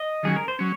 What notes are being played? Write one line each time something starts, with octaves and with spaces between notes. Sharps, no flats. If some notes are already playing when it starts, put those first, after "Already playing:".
Already playing: D#5
D#3 F#3 C#4 G#4
A#4
C5
F#3 C#4 C#5